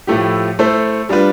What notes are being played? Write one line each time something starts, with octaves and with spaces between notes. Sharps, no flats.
A2 F3 A3 E4 G4
A3 E4 A4 C5
G3 D4 F4 B4